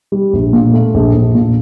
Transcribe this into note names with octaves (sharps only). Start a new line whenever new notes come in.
G3
A#1
A#2
A3
A#1
A#1
A#2